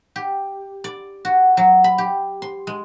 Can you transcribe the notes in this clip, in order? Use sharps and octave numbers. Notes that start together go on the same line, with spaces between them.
G4
D5
F#4
F#3
B5
G4
C6
G#3